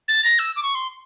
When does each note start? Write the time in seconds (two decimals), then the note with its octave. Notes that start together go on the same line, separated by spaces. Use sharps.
0.08 A6
0.24 A#6
0.39 E6
0.56 D6
0.63 C#6
0.75 C6